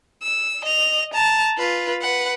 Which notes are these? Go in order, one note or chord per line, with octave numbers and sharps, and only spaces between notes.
E6
D#5 F7
A5 A#5
F4 B4
B4 F#5